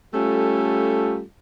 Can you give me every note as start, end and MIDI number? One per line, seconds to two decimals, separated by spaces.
0.14 1.21 55
0.14 1.21 57
0.14 1.21 61
0.14 1.21 65
0.14 1.21 67
0.14 1.21 69